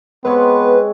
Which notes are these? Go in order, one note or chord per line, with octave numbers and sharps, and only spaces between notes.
G#3 B3 C4 B4 C#5